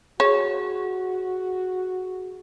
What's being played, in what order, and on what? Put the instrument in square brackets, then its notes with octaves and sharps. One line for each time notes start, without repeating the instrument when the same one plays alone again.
[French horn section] F#4 [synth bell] G#4 [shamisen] C#5